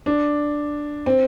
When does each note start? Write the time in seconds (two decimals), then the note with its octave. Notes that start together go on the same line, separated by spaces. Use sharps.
0.06 D4
1.06 C4